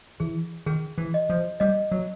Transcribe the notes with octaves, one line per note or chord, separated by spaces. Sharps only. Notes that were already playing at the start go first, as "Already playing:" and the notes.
E3 G#4
D#3 G#4
E3
D#5
F3
G3 D#5
F#3